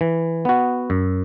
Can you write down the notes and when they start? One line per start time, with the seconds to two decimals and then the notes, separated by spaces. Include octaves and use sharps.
0.01 E3
0.45 B3 F#4
0.90 F#2